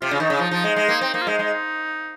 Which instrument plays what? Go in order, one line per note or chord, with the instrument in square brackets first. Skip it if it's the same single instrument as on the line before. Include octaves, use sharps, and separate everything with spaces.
[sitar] C3 [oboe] F4
[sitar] C#3
[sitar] D#3 [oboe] D#4
[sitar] C#3
F3
F3
G#3
G#3
A#3
C4
[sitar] A#3 [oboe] D#4
[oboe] F4
[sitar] G#3 [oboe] D#4
[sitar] G#3